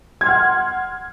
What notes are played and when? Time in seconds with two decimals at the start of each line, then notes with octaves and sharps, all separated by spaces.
0.21 G#6
0.24 C6
0.26 F6
0.29 F#5